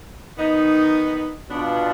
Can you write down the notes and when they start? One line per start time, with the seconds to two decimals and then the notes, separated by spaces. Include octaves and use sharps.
0.37 D#3 B3 D#4
1.48 B2 B3 D4 F4